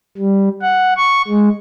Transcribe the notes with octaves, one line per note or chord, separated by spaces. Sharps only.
G3
F#5
C#6
G#3